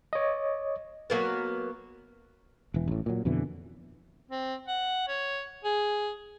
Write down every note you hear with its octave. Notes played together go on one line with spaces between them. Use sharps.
C#5 D#5
F#3 A#3 B3
E1 E3
A1 A2
A#2 F#3
F2 B2 D3 E3
C4
F#5
C#5
G#4